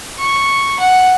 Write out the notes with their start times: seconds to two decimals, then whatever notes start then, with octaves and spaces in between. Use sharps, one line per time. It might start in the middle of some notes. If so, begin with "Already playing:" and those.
0.19 C#6
0.79 F#5